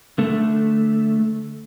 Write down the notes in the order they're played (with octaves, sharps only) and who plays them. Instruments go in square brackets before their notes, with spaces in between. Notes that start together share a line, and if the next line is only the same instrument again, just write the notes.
[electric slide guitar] D3 A3